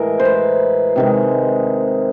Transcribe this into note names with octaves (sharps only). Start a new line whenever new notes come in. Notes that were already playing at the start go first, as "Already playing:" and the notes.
Already playing: A2 E3 G#3 A#4
C5
B4
C3 D#3 G#3